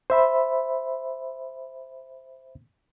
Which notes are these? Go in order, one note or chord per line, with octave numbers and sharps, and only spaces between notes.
C5 E5 B5